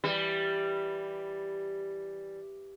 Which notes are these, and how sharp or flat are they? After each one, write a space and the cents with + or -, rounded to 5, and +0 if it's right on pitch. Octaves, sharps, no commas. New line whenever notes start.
E3 +0 G3 +0